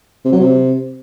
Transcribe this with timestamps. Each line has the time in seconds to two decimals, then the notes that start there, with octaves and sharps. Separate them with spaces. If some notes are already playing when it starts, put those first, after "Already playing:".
0.25 C3
0.33 F#3
0.40 C3